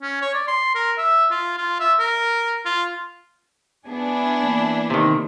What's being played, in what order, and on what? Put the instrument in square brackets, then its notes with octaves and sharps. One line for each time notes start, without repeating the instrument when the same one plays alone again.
[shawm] C#4
C#5
D5
C6
A#4
E5
F4
F4
E5
A#4
F4
[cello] B3 G#4 [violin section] D4 E4
[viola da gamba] E3 A#3
[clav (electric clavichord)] C3 D#3